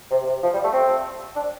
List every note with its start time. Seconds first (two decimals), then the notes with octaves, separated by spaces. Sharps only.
0.11 C3
0.26 C3
0.43 F3
0.53 G3
0.64 A3
0.73 C4
1.36 D4